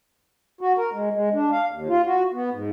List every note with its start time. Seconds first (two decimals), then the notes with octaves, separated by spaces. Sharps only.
0.61 F#4
0.78 A#4
0.93 G#3
1.13 G#3
1.33 D4
1.52 F5
1.72 D#2
1.89 F4
2.05 F#4
2.34 B3
2.52 G#2